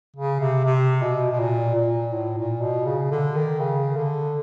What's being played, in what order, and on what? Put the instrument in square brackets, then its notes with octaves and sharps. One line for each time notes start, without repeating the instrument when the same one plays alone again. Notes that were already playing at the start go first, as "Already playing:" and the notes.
[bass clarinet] C#3
C3
C3
B2
B2
A#2
A#2
A2
A#2
B2
C#3
D3
D#3
C#3
D3